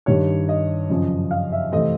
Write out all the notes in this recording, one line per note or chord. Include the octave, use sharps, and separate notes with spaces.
G2 D#3 G3 C#5
D#5
F#2 C#3 F3
F5
E5
C3 E3 A3 C4 D#5